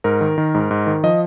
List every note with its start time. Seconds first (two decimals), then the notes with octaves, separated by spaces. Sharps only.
0.04 G#2 A#4
0.21 D#3
0.38 D#3
0.54 G#2
0.71 G#2
0.87 D#3
1.03 F3 D#5